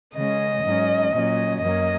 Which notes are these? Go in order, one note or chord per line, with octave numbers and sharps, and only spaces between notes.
C#3 G#3 C#4 D#5
G#2 F#3 C#4
A#2 F#3 C#4
F#2 F#3 A#3 C#4 D#5